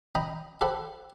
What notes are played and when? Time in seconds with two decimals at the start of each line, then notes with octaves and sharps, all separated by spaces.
0.15 D#5 G5 A#5 B5
0.61 G4 A4 C5 F#5 B5